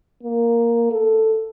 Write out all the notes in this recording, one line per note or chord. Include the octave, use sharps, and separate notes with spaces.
A#3
A4